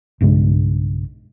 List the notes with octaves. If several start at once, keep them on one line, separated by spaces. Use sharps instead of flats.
B1 G2 C#3 G#3